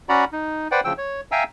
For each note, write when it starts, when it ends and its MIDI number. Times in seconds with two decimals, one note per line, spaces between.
0.09 0.25 61
0.09 0.25 66
0.09 0.25 74
0.09 0.25 78
0.09 0.25 82
0.09 0.25 83
0.32 0.68 63
0.71 0.81 71
0.71 0.81 72
0.71 0.81 74
0.71 0.81 78
0.71 0.81 79
0.85 0.93 38
0.85 0.93 49
0.85 0.93 53
0.85 0.93 79
0.85 0.93 88
0.98 1.21 73
1.32 1.44 76
1.32 1.44 77
1.32 1.44 79
1.32 1.44 80
1.32 1.44 82
1.32 1.44 88